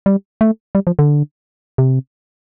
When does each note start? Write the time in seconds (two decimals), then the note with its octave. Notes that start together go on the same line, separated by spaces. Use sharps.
0.06 G3
0.41 A3
0.75 G3
0.87 F3
0.99 D3
1.78 C3